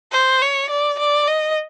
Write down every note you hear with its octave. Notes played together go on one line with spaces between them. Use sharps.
C5
C#5
D5
D5
D#5